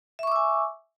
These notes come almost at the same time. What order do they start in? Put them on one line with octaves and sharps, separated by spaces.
E5 C#6 D6 E6 G#5